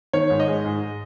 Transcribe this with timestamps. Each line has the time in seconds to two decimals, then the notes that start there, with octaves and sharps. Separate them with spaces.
0.13 D#3 C#5
0.30 G#2
0.40 D#5
0.48 G#3
0.65 G#2